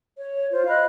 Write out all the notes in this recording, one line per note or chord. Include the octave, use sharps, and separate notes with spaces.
C#5
F4 C5
D#5 F5 B5 F#6